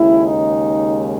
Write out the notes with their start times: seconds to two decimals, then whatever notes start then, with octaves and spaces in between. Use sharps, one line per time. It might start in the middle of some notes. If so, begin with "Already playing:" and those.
Already playing: D#2 C#3 G#3 E4
0.25 D#4